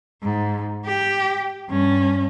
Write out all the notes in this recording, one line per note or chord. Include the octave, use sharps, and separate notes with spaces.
G#2
G4
G2 C#4